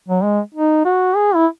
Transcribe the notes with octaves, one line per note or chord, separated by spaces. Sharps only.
F#3
G#3
D#4
F#4
G#4
E4